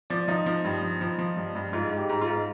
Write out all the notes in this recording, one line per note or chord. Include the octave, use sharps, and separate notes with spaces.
F3 D5
F3 D#4
F3
G2
F3
F3
F3
G2
G2
G#2 F4
G#2
G4
G#2
F4
G#2